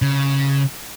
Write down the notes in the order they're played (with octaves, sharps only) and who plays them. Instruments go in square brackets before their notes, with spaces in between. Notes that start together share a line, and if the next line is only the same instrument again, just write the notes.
[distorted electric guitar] C#3